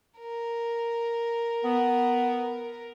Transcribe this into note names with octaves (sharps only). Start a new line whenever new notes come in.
A#4
B3